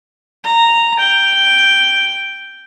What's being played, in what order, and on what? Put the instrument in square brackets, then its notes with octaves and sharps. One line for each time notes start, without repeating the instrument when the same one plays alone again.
[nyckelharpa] A#5
G5